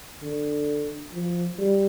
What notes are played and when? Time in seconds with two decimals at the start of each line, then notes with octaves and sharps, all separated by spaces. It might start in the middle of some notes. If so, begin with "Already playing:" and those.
0.22 D3
1.13 F3
1.58 G3